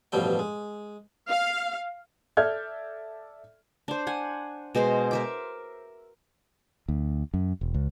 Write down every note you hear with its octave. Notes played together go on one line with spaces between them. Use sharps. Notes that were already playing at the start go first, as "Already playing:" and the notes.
A1 G2 B2 F3 G3 G5
G#3
F5
A4 D5 E5 F6 G6 G#6
D4 C5
F#5 G#5
B2 G#3 C5 C6
A#4 E5 D6
D2
F#2
E1
C#2